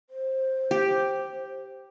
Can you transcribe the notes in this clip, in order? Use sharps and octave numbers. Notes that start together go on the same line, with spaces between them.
C5
G4